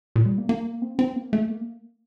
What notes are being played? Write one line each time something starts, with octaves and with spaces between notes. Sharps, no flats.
A#2
G3
A#3
A#3
C4
C4
A#3
A3
A#3